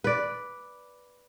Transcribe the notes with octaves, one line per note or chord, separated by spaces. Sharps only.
B4 D5